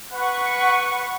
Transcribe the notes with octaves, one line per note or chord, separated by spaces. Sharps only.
B4 F#5 C#6